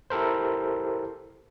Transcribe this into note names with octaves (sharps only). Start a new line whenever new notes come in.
E4 G4 A4 A#4 C5